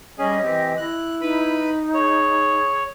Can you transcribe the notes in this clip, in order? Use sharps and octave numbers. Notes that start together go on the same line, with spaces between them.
G3 C#4 G#4 D#5
E3 C4 G4
E4 F#6
D#4 B4 B5
G#4 C#5